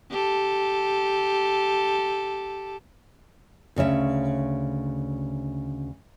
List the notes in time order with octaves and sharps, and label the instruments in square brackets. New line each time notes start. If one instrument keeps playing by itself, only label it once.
[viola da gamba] G4 A4
[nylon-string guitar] D2 C#3 C#4 E5